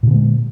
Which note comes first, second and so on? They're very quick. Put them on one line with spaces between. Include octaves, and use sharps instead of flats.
A#2 D3 B3 G#3